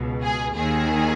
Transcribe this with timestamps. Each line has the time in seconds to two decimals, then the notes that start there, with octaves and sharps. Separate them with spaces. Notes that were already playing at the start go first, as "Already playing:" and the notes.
Already playing: C#2 B2
0.23 G#4
0.55 D#2 D#3 G#4